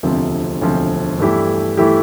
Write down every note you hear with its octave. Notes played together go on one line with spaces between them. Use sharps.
E1 D2 C3 F3 C4
E1 D2 C3 F3 C4
G2 E3 A3 E4 G4
E3 A3 E4 G4